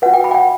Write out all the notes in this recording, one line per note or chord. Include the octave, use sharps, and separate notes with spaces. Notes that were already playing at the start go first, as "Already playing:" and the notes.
F#4 B4 F#5
G5
B5
G5
F#5